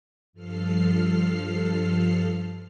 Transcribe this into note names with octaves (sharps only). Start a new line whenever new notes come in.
G2 F3 A4 F6 C7